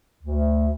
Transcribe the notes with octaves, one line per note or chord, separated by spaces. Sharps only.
D2